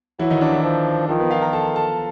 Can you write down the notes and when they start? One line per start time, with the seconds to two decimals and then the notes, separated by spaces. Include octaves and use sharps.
0.19 E3 F#3 E4
0.31 D#3 D#4
0.41 D4
0.53 E3 E4
0.63 F3
1.08 D#3 F3 F4
1.19 B3 B4
1.31 F4 F5
1.42 A#4 A#5
1.53 A4 A5
1.75 A4 A5